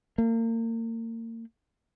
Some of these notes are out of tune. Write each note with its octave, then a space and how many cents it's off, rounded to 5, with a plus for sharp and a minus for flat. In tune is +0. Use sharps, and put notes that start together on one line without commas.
A#3 -35